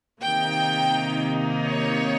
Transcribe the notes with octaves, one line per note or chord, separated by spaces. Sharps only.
C3 D#3 A#3 D#4 G5
C#5